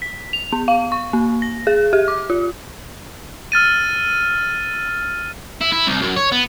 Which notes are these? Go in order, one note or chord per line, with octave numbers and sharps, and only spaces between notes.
B6
F7
B3
F5
C#6
A#3
A#6
G#4
G4
D6
F4
E6 F6 A6 D#7
E4
E4
C2
F#2
C#5
B3